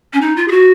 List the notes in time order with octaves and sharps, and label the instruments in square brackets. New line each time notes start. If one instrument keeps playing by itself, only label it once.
[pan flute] C#4
D#4
F4
G#4
F#4